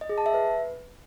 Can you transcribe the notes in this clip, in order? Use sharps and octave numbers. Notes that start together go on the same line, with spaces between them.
D#5
G#4
A5
E5
B4